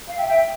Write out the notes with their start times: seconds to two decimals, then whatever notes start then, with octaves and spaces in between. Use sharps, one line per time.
0.08 F5
0.16 E5 G5
0.27 E5 G5